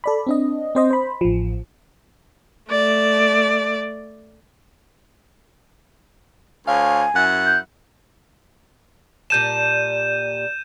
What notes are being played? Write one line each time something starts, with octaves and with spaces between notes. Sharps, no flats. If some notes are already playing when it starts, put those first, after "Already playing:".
A4 D5 B5
C4 D4 D#5
C4 C5 D#5
C5 B5
A1 F3
A3 D5
D2 C#5 F5 G#5
F#2 E4 F#5
G6
A#2 G3 A5 G6 D#7 E7